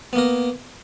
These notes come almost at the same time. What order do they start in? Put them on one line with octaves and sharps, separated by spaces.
B3 A#3 A#4